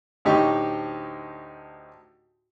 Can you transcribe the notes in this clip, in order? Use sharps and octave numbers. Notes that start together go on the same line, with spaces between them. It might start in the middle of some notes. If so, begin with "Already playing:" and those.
D2 A2 D#4 G4 C#6